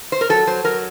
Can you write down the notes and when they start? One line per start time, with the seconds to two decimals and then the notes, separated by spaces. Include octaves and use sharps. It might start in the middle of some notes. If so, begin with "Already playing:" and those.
0.12 C5
0.21 A#4
0.29 F#3 A4
0.47 F#3 C5
0.64 F#3 A#4